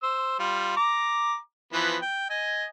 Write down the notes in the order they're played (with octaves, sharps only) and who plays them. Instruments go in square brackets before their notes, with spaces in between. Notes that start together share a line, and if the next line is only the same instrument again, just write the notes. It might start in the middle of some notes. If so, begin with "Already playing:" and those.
[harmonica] C5 E6
G3 F4
A#5 D6
E3 F3 B3
G5
D#5 G#5